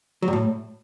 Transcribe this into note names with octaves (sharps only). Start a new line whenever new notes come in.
F#3
G2
A2